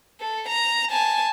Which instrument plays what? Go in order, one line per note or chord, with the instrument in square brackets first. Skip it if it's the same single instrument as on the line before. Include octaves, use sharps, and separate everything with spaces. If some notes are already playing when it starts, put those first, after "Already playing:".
[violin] A4
A#5
G#5 A5